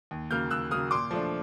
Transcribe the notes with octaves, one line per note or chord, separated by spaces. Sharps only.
D#2
C#3 F#3 A#3 F6 G6
D#2 E6 F#6
C#3 F#3 A#3 D#6 F6
A#2 C6 D6
F3 A3 D4